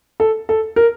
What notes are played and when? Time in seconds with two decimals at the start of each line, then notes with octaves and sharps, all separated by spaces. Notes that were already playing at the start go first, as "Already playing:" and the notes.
0.20 A4
0.49 A4
0.76 A#4